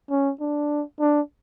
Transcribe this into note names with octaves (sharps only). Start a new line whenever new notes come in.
C#4
D4
D4